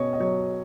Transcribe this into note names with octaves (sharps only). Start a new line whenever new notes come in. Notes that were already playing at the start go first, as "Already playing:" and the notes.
Already playing: B2 C#4 C#5 D#5
D#5
F#3 C#5